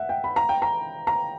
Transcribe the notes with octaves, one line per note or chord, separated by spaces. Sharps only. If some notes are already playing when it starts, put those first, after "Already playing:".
Already playing: E5 F#5
G5
B5
A#5
G5
A#5
A#5